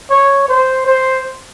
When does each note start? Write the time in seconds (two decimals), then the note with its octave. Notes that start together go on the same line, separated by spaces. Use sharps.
0.10 C#5
0.48 C5
0.87 C5